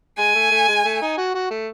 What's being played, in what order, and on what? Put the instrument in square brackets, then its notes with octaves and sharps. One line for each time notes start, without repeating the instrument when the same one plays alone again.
[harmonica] G#3 [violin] G#5
[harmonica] A3
A3
G#3
A3
D#4
F#4
F#4
A3